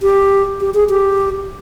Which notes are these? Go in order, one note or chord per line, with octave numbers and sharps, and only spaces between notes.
G4
G4
G#4
G4